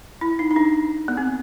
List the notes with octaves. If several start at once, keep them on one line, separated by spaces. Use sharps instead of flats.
E4
D#4
D#4
D4
B3
C4